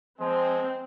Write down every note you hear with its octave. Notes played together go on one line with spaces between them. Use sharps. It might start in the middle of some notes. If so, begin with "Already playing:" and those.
F3 G#3 C4